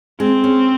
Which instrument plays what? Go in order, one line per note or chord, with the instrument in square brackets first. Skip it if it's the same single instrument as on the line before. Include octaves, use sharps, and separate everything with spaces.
[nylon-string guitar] G#3 [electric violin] C4
[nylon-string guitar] C#4